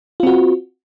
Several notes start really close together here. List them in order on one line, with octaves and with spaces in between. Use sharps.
F4 C4 F#4